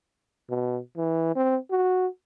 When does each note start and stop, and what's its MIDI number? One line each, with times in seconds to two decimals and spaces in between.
0.50 0.79 47
0.97 1.33 52
1.36 1.57 60
1.71 2.07 66